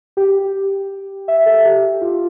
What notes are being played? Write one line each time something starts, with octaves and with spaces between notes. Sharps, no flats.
G4
E5
A4
G4
F4